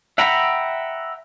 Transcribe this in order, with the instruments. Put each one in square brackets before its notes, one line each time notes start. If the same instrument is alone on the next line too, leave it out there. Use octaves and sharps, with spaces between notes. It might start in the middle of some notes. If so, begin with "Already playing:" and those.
[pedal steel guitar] E5 F#5 G5 A#5 B5